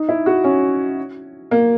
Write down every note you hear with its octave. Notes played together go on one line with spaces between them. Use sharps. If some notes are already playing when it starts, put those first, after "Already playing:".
Already playing: D#4
E4
F#4
C#4
A#3